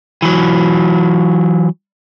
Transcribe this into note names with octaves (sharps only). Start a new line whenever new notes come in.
E3 F#3